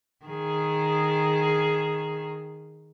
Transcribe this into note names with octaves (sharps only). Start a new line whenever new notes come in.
D#3 G#4